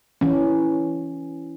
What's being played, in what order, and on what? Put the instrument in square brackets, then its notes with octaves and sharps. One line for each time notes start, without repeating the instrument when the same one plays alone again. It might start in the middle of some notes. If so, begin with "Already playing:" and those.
[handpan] E3 C#4